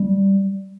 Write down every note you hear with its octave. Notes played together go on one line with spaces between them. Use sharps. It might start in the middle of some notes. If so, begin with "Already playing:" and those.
Already playing: G3